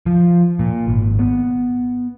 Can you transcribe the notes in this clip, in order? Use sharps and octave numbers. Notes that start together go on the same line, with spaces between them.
F3
A#2
G#1
B3